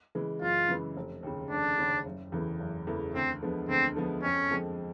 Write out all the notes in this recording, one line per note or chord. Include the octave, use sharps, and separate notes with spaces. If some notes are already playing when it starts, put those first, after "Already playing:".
C#3 E3 G#3
F#2 F4
C#3 E3 G#3
F1
D#2 C#3
F1 D4
D#2 C#3
F#1
E2 C#3 E3 A3
F#1
E2 C#3 E3 A3
D2 C4
D3 F3 G#3 B3
D2 C4
D3 F3 G#3 B3
F2 C#4
D3 F3 G#3 C4